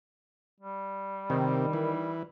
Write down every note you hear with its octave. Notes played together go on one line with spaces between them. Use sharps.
G3
C3 D#3
E3